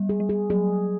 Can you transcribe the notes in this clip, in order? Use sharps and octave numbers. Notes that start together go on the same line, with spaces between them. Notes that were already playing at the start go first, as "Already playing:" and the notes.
Already playing: G3
G#4
G3
G#4
F#3 G#4